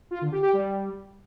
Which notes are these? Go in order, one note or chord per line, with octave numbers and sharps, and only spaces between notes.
F4
D3
G4
G4
G3